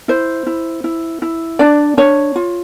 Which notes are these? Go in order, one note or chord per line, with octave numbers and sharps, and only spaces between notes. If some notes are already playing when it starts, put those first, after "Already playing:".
E4 C5
E4
E4
E4
D4 D5
D4 C#5
F4